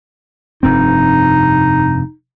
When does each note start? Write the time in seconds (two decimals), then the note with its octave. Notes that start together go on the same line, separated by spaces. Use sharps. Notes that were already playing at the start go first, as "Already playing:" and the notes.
0.63 F1 G2 C4 D#4